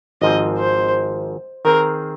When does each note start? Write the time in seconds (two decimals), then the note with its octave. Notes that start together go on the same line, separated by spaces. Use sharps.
0.22 G#1 G#2 F3 C4 D#5
0.58 C5
1.65 D#3 C4 G#4 A#4 C5